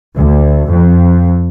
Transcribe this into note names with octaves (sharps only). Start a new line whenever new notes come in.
D2
F2